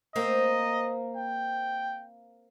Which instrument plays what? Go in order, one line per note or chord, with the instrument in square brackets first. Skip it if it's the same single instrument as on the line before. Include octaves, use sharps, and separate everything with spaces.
[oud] A#3 C4 [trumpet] D#5
[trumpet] G5